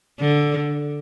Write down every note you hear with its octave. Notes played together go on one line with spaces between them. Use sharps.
D3